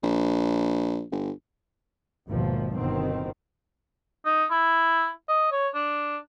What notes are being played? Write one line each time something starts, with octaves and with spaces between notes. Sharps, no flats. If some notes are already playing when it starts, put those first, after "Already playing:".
A#1
G1
G#1 D#2 B2 F3
G1 B2 D#3 C4
D#4
E4
D#5
C#5
D4